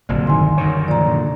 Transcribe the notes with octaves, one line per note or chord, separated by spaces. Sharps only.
F#1 C2 F#2 A#2 D3
G2 D#3 E4 G#5 C6
F#2 D#3 C#5
A#2 F3 D5 A#5
C2 A#2 D3